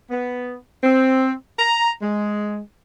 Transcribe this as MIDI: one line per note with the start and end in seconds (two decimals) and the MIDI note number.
0.10 0.55 59
0.83 1.31 60
1.59 1.91 82
2.01 2.57 56